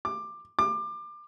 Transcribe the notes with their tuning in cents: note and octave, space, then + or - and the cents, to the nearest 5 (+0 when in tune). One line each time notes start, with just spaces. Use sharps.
D6 +15
D6 +25